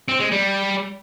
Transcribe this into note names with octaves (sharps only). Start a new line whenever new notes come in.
C4
G#3
G3